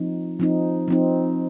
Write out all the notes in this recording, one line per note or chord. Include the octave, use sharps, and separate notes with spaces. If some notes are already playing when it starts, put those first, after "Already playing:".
Already playing: F3 C4 D#4
F3 C4 D#4
F3 C4 D#4